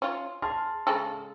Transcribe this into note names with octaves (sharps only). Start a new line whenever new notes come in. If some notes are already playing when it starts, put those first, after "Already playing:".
C#4 F4
G#4 A5 C6 F6
C#3 G#3 A4